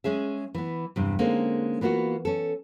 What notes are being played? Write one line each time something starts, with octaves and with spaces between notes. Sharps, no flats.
G#3 C#4 G#4 E5
E3 B3
E2 G2 C3
D3 G#3 A#3 C4 C#4 D#4
E3 A#3 B3 F4 F#4
C#4 A4